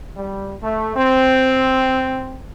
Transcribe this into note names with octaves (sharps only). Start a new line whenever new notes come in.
G3
A3
C4